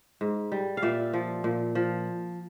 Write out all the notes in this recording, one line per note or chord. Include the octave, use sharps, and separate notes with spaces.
G#2
G3
F5
A#2 D5 E5
F3
A#2
F3